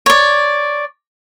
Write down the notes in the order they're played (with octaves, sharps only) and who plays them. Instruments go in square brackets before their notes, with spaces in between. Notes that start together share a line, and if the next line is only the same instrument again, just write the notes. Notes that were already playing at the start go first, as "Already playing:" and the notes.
[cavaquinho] C#5 D5